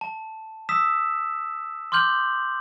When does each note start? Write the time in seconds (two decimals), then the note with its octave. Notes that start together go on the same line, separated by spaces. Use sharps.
0.01 A5
0.69 D#6 E6 B6 E7
1.92 C6 D6 F6 G6 F#7